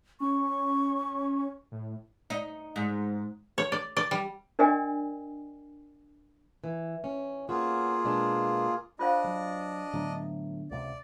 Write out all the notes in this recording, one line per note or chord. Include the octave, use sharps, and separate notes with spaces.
C#4 C#6
A2
D#4
G#2
C#5
D5
D5
G3
D4 A#4 D5 D#5 G5 G#5
E3
C#4
A#3 B3 C#4 F4 F#4 G#4
B2 G#3 D4
D4 F4 C5 D#5 F5
F#3
A2 D3 F#3 B3
C#2 F#2 C3 D5